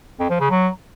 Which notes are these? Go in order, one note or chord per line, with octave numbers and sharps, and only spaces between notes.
F2
F3
C#3
F#3